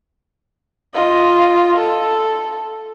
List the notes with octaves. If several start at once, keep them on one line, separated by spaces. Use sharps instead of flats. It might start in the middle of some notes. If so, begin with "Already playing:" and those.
F4 D#5
A4